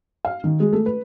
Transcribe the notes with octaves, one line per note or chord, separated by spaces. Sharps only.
F5
D#3
G#3
A3
B4